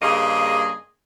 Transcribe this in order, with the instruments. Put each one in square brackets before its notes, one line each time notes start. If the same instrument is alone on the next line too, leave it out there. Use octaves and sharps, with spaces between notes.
[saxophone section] G2 C#3 A#3 G#4 D#5